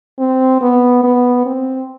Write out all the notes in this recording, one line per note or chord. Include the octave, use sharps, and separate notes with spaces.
C4
B3
B3
C4